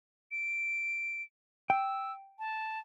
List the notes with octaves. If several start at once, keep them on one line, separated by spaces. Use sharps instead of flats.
D7
G5 E6
A5